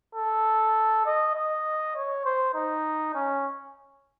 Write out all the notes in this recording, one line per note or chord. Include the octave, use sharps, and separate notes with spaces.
A4
D#5
D#5
C#5
C5
D#4
C#4